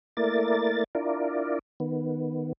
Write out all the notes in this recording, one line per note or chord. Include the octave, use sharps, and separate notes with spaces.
A3 A#3 E4 A#4 D5 A6
D4 E4 F4 A#4 D5
D#3 B3